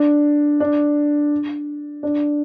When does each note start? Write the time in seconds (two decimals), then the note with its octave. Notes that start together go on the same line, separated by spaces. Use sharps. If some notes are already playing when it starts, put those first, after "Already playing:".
Already playing: D4
0.60 D4
2.03 D4